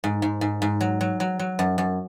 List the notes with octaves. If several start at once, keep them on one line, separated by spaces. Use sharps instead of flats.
G#2
G#2
G#2
G#2
F#3
F#3
F#3
F#3
F#2
F#2